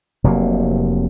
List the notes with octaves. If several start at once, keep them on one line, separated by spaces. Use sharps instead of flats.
F1 C3 F#3 A#3